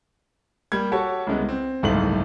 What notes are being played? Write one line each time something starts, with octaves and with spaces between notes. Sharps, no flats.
G3 A#3 G#6
F#4 G4 A4 C#5
C2 C#3 G#3 B3
C4
F#1 C2 G#2 A3 F5 F#7